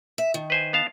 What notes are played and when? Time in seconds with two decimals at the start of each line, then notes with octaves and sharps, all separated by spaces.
0.18 E5
0.34 D#3
0.50 B4 C5 G#5
0.73 B3 F5 A5